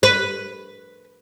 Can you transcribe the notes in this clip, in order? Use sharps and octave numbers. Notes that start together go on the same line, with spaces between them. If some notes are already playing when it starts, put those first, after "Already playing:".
B4